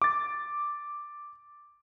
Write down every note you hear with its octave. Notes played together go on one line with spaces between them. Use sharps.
D6 A6